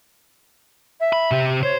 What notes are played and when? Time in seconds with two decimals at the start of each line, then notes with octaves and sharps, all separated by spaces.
1.00 E5
1.13 B5
1.31 C3 G4
1.63 C5 C#5